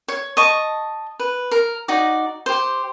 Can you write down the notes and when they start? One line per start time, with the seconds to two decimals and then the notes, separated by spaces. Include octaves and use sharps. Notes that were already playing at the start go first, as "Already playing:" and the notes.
0.08 C#5
0.37 D#5 A5 C#6
1.20 B4
1.51 A#4
1.88 D#4 F#4 D5
2.46 G4 C5